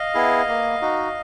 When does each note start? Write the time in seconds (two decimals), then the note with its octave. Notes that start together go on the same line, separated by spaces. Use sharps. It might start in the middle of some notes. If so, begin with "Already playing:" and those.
Already playing: D#5 F5
0.15 B3 E4 G#4
0.48 A#3
0.82 D#4 F#4